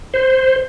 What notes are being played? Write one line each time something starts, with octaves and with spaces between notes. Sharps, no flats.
C5